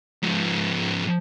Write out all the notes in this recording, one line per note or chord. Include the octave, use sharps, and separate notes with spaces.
G#2 F3